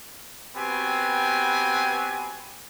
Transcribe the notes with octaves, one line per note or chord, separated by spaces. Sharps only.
B3 C4 F#4 G4 B4 G#5